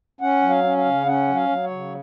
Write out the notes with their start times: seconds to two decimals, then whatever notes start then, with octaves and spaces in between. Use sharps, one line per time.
0.21 C#4 F#5
0.42 F#3
0.49 F5
0.64 C#4
0.78 F5
0.85 C#3
1.07 C#4 F#5
1.28 F#3
1.35 F5
1.49 F#3
1.63 C#5
1.71 C#3